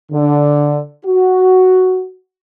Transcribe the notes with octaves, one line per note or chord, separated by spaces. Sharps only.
D3
F#4